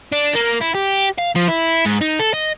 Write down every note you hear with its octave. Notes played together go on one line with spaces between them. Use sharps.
D4
A#3
E4
G4
F5
F3
E4
G#2
D#4
A4
D#5